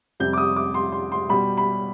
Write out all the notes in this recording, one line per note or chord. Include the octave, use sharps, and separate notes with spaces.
F2 C3 G3 G6
D6
D#6
D6
C6
C6
C6
B2 G3 B5
B5